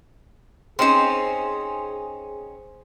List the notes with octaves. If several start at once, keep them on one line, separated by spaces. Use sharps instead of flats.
C4 C#4 D#4 G#4 C5 C6